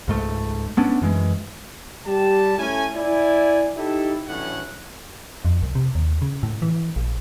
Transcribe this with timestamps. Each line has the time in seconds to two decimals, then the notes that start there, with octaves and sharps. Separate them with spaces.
0.08 C#2 G#2 A3
0.77 A3 B3 C#4 D4
1.02 F#2 E3 G#3
2.06 G3 G4 A5
2.58 A3 C#4 E4 A4 G#5
2.95 E4 D5 G#5
3.77 D#4 E4 G4 A4
4.28 A1 A2 D3 F#3 C#4 F#5
5.45 F2
5.63 C2
5.75 C3
5.95 D#2
6.22 C#3
6.43 A2
6.62 E3
6.96 A#1